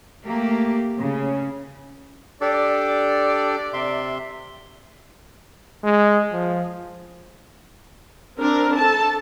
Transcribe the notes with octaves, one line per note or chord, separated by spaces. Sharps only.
A3 A#3 G4
C#3
D4 G4 A4 D5
C3 E5 C6
G#3
F3
C4 D4 A#4
A4 A5